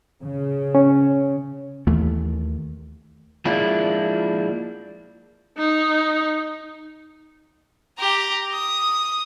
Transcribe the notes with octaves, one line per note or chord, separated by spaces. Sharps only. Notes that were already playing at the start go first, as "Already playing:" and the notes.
C#3
C#4
D#2 E3 A3
F3 G#3 A#3 D4 E4
D#4
G4 A#5
D#6